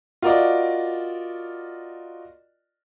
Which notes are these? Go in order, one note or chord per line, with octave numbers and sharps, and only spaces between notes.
F4 F#4 A#4 D5 D#5 D6